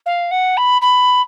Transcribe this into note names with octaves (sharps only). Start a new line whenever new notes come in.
F5
F#5
B5
B5